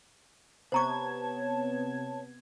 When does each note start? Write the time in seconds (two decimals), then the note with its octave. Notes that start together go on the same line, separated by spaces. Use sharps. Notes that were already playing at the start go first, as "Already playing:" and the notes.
0.72 C3 B3 C5 C#5 A5 A#5 C#6 G#6